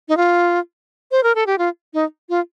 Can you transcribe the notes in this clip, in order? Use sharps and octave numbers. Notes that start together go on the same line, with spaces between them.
D#4
F4
C5
A#4
A4
G4
F4
D#4
F4